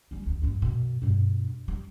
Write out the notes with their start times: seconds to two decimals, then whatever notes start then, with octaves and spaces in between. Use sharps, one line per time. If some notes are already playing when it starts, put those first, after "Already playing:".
0.11 G3 C#4
0.26 D2
0.42 D2 G2
0.61 F#2 B2
1.02 G2 B2
1.68 G3